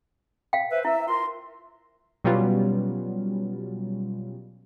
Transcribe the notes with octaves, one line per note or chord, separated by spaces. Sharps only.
F5 G5
B4 C5 E5
E4 E5
F4 A#4 C6
B2 F#3 G3 B3 C#4 F4